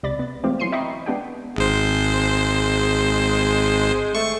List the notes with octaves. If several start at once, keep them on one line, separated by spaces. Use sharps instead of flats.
C#2 C3 D5 B5 A6
B3
E3 G#3 A3 C4 F4 G4
E3 F#3 C6 C7 C#7 D#7
D#5 E5 G5 A#5 B5 C#6
G#3 B3 D4 G4 F#5 G5
G#1 G#3 C5
A3 C#6